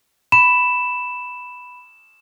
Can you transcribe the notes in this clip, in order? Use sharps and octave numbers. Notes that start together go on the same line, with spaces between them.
B5 E7